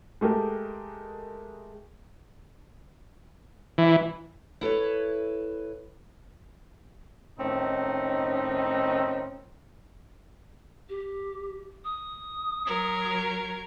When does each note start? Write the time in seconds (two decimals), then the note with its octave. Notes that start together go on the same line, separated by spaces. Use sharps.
0.21 G#3 A3 G4 A#4
3.78 E3
4.61 E4 A4 B4 C#5
7.39 A2 D#3 C4 C#4 D#4
10.89 G4
11.85 D#6
12.65 F#3 A#4 G#6